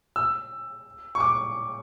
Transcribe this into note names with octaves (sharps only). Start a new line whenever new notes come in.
E6
C#6
D6